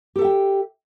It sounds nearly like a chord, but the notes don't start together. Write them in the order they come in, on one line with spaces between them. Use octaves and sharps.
G4 A4 E5 G5